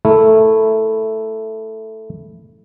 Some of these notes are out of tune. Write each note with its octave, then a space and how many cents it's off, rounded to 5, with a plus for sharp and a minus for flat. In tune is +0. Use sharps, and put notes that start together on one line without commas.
A3 +0 E4 -5 A#4 +0